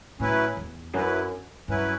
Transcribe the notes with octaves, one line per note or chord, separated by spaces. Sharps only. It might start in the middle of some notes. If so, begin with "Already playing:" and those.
A2 F#3 C#4 E4 B4
E2
F#2 F#3 C#4 E4 B4
G2 F#3 C#4 E4 B4